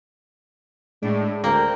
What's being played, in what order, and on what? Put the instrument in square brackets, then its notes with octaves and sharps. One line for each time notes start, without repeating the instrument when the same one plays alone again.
[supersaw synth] A2 [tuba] G#3 [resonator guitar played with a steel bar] D4
[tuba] D2 [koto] A#3 [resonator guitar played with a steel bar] C4 [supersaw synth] G6